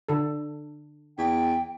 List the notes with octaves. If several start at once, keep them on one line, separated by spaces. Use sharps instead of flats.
D3 A4
E2 G5